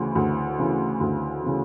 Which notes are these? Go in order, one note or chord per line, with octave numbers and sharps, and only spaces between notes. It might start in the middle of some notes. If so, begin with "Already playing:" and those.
Already playing: D2 C#3 E3
D2
C#3 E3
D2
C#3 E3